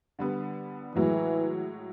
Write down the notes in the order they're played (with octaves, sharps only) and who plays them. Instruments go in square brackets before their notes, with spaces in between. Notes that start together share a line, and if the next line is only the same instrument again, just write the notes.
[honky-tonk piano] D3 G3 B3
[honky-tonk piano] A2 F#3 G#3 [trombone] E3